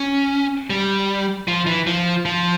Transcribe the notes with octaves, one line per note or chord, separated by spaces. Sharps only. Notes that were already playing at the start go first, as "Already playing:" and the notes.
Already playing: C#4
G3
F3
E3
F3
F3